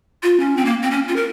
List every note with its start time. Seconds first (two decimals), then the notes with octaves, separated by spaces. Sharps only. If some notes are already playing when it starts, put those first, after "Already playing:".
0.23 F4
0.40 C#4
0.57 C4
0.65 A#3
0.83 C4
0.91 C#4
1.08 F4
1.16 A#4